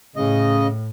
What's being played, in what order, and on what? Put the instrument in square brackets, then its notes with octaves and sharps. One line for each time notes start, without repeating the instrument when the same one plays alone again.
[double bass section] A2 [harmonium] C#3 D#5